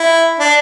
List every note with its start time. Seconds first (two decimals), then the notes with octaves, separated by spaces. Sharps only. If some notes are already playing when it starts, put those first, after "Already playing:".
Already playing: E4
0.39 D4